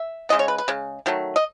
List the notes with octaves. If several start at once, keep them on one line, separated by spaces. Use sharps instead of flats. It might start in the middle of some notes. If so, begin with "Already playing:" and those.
Already playing: E5
C#3 G#3 B3 D#5
C#5
B4
B4
C#3 G#3
D#3 F#3 A3
D#5